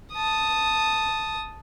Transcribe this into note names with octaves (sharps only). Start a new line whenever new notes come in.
A5 D#6